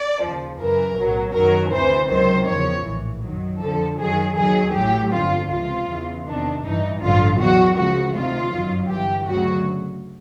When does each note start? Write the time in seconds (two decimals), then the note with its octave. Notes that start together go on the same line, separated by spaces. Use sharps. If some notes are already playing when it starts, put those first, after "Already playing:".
Already playing: D5
0.22 D#2 C#3 F3
0.60 F#2 C#3 E3 A#4
0.97 B1 A2 F#3
1.35 F#2 D#3 F#3 A#4
1.73 D2 C3 E3 C5
2.11 C#2 C3 D#3 F#3 C5
2.48 E2 C#3 F3 C#5
2.86 A#1 A2 E3
3.24 F#2 D#3 F#3
3.62 F2 D3 F3 A4
3.99 F#2 D#3 F#3 G#4
4.37 D#2 D#3 F#3 G#4
4.75 A1 A2 F#3 G4
5.13 G1 F2 D3 F4
5.50 C#2 C3 F3 F4
5.88 E2 C#3 E3
6.26 E2 C3 D#3 D4
6.64 A1 G2 E3 D#4
7.02 A1 G2 D3 F3 F4
7.39 E2 B2 F#3 F#4
7.77 C#2 C#3 F3 F#4
8.15 D2 C3 D#3 F4
8.53 G1 F#2 D#3 F#3
8.90 G1 G2 E3 G4
9.28 D2 C#3 F#3 F#4